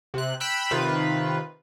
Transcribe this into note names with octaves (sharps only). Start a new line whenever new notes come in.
C3 F#6
G5 B5 E6 F#6
C3 D#3 F4 B4